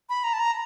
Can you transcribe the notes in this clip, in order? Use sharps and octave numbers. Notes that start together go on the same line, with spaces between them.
B5
A#5
A5
A#5